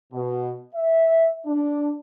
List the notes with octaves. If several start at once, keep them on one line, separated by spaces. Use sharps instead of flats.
B2
E5
D4